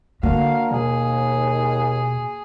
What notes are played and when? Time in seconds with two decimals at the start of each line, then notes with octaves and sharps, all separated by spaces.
0.23 D3 A#3 D4 F#4 A#4 F5
0.71 D#2 B2 G#4